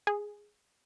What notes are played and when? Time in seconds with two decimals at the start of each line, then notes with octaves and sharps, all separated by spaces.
0.07 G#4